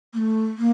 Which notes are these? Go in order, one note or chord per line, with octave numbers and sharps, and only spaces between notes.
A#3
A3
A#3